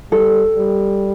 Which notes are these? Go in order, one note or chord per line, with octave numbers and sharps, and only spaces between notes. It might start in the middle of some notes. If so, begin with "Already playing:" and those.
G3 A4
G3